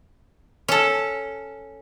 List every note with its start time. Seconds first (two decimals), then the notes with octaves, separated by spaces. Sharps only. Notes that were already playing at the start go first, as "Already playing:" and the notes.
0.68 C#4 A4